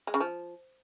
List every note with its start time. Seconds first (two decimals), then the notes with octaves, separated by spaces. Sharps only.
0.07 G#3
0.14 C#3
0.20 F3